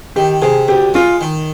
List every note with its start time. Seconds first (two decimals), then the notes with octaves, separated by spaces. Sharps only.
0.16 D#3 G4
0.42 C3 G#4
0.68 D2 G4
0.94 G#3 F4
1.21 D#3